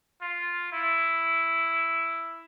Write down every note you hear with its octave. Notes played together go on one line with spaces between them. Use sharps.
F4
E4